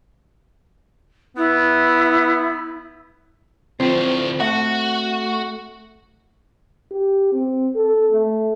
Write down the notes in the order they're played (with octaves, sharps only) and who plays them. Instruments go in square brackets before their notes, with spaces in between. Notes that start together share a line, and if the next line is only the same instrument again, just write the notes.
[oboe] B3 [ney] E4
[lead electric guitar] D2 A2 [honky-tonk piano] F3 [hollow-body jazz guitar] C4
[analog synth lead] A3 [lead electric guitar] F#4 [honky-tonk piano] F#5
[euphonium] G4
C4
A4
A3